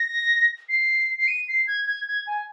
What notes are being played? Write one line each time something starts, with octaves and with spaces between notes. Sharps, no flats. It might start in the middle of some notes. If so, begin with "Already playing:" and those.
Already playing: A#6
C7
C7
D#7
C7
G#6
G#6
G#6
G#5